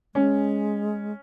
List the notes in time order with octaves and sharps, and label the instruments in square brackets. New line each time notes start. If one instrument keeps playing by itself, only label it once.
[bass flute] G#3 [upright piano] C#4